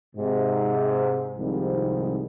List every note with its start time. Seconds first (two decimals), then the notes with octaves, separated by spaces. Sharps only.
0.16 G#2 C3
1.38 C2 G#2 C3 D#3 F3 G3